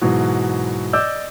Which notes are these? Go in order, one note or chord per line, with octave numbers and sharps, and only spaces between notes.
G#2 B2 E3 F#3
D5 D#5 D6 E6 G6